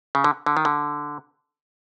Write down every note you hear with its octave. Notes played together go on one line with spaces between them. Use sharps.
C#3
D3
D3
D#3
D3